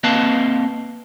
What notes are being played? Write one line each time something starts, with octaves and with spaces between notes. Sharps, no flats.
A#3 C4 B4 D#5 F5 A5